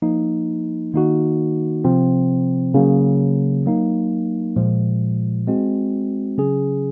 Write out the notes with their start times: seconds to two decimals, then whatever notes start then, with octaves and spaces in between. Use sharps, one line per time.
0.02 F3 A#3 D#4
0.94 D#3 A#3 D#4 F#4
1.84 C3 F3 C4
2.74 C#3 F#3 A#3
3.65 F#3 A#3 D#4
4.56 A#2 F3 G#3
5.47 G#3 C4 F#4
6.38 C#3 F#3 C#4 G#4